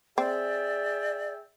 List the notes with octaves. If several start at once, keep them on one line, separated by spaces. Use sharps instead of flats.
C4 G#4 D5 E5 G5